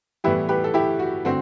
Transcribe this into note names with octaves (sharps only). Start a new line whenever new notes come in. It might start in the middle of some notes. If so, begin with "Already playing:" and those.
A2 E3 G3 B3 E4 G4
G4 B4
A4
E4 G4
F#4
D3 A3 C4 F#4